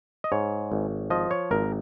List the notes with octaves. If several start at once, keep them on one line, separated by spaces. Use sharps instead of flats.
D#5
G#2 C#5
G#1
F3 D#5
C#5
G#1 A#4